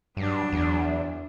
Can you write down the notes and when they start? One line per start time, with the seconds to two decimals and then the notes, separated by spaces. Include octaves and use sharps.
0.17 G2 F#3 D4
0.52 E2